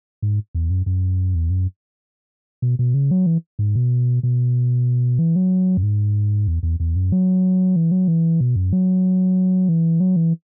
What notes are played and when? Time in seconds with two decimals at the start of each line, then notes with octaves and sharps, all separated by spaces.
0.22 G#2
0.55 E2
0.70 F#2
0.86 F#2
1.35 E2
1.50 F#2
2.62 B2
2.79 B2
2.94 C#3
3.11 F#3
3.26 E3
3.59 G#2
3.75 B2
4.23 B2
5.19 E3
5.36 F#3
5.77 F#2
5.83 G#2
6.47 E2
6.63 E2
6.80 E2
6.96 F#2
7.12 F#3
7.76 E3
7.91 F#3
8.08 E3
8.41 B2
8.56 F#2
8.73 F#3
9.69 E3
10.00 F#3
10.16 E3